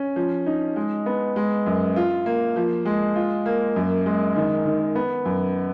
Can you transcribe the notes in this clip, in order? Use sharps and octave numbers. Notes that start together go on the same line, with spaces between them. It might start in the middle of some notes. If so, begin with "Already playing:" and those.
Already playing: C#4
F3
D#4
G#3
B3
G#3
F#2
F4
A#3
F3
G#3
F4
A#3
F#2
G#3
D#3
D#3
B3
F#2